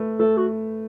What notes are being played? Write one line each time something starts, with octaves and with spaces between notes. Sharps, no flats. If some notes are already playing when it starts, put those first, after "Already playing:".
Already playing: A3 B4
A3 A4
F#4